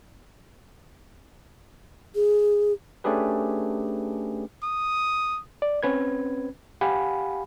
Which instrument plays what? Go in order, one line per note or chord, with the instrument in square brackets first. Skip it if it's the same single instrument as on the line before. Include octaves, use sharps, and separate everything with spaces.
[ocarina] G#4
[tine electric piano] A3 C#4 D4 G4 G#4 B4
[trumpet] D#6
[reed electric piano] D5
C4 C#4 B4 G#6
G4 F5 F#5 G#5 B5